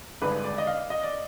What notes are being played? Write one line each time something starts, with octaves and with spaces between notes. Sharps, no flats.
G#1 G2 D3 G#3 B4
D5
D#5
F5
D#5
D5